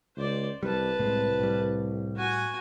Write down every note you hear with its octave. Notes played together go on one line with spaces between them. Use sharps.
C#2 C5 D5
C2 G3 B4 A5
C2 A2 C3 G#3
A2 G3
F#4 G#5